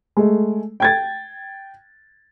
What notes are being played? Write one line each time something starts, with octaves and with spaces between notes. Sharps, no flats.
G#3 A3
G5 G#6 A6